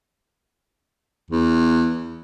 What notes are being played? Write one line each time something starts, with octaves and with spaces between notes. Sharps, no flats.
E2